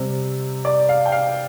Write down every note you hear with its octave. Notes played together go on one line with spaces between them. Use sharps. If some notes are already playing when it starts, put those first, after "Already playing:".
Already playing: C3 G3 C4
D5
F5
G5
F5